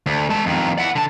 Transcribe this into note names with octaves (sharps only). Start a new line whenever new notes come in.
D2
G#3 A5
F2 D#3
E4 F#5
D3 A5